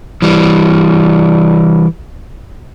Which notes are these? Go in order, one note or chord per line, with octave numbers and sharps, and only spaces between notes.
E3 G3